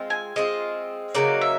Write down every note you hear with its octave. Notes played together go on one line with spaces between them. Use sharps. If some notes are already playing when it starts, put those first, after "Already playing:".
Already playing: G#3 C4 F4
G#5
G#3 C4 F4 D#5
C#3 F#3 A#3 D#4 D5
E5